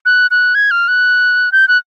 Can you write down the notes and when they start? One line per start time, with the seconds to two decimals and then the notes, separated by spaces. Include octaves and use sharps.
0.06 F#6
0.31 F#6
0.55 G#6
0.71 F6
0.88 F#6
1.52 G6
1.68 F#6